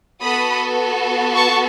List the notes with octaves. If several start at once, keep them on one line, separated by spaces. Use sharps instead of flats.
B3 F#4 A4 B5 D#6
A5 C#6